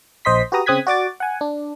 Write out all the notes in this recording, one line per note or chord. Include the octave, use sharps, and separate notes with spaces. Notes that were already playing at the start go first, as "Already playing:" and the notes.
A#1 C5 D#5 C6 B6
F#4 G4 B4 A#5 D#6
C#3 C4 D#6 F#6 G#6 B6
F#4 D5 D6 A6
F#5 G#5
D4